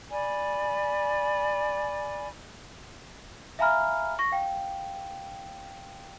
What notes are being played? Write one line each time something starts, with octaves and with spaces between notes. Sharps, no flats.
D5 G#5 B5
E5 F5 G#5 A#5 B5 F6
C#6 A#6
F5 G5